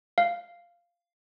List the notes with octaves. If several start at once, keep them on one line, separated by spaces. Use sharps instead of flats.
F5